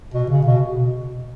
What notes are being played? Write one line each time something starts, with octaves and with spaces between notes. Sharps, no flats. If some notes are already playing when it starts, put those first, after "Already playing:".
B2
C#3
B2